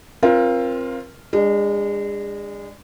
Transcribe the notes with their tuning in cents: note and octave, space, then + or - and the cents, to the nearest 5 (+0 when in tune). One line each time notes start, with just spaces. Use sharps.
C4 +25 F4 -5 A#4 +30
G#3 -30 D4 +0